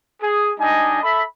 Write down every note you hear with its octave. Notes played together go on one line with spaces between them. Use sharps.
G#4
G3 D4 D#4 D#5 G#5
A4 E5 B5